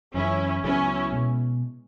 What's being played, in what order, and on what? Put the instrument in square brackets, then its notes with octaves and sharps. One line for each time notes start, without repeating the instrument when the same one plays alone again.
[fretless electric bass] F#2 E3 G#3 [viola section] C#4 E4
[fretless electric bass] C#2 C#3 F#3 B3 [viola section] C#4 E4
[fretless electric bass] B2 G#3